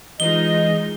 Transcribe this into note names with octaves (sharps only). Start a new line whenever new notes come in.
E3 G#3 D#4 F4 D#5 G7